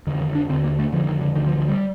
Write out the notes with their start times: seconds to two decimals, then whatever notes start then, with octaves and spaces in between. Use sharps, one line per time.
0.07 F2 D3 D#3
0.21 D#3
0.35 D4
0.49 D3 C4
0.53 D#2
0.64 A#3
0.79 A3
0.92 F2 D3 F3
1.08 D#3
1.21 D3
1.36 D2 D3 D#3
1.46 F3
1.57 F3
1.68 G3